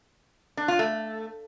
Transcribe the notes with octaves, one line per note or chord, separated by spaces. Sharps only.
D4
F4
A3